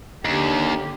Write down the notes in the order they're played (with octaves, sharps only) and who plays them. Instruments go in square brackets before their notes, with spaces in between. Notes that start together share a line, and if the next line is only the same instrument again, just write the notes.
[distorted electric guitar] D#2 [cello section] D3 G4